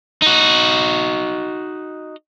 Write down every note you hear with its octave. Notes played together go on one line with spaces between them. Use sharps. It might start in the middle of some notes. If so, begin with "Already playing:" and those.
D#4 F#4